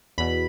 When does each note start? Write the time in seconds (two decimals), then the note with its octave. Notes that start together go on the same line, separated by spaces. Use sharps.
0.18 E2 B2 B5